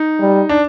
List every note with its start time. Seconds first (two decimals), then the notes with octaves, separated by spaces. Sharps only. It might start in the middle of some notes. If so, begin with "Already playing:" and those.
Already playing: D#4
0.20 G3
0.49 D4